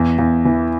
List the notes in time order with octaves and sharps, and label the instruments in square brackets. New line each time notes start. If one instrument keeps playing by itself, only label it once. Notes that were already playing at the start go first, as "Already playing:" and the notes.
Already playing: [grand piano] E2
E2
E3